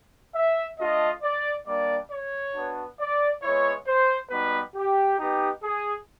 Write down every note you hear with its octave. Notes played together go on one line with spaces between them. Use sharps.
E5
A3 D4 F4 D#5
D5
G3 A#3 D4 D5
C#5
B3 D4 F#4
D5
G#3 B3 E4 C#5
C5
G3 B3 D#4 F#4 B4
G4
B3 D#4 G4
G#4